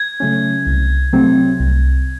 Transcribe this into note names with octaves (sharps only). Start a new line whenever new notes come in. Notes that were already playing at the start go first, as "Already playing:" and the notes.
Already playing: G#6
C#3 F#3 A3 C#4
C2
C3 F#3 A3 C4
C2